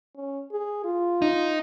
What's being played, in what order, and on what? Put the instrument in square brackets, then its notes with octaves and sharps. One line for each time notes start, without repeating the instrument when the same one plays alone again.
[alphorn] C#4
G#4
F4
[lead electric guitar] D#4